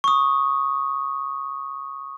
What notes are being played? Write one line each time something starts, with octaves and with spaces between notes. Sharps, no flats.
C#6 D#6